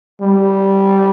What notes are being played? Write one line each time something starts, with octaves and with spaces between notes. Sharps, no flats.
G3